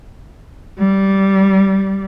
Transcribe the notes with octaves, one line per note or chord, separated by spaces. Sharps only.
G3